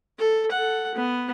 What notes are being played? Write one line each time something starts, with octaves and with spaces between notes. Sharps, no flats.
A4
A4 F#5
B3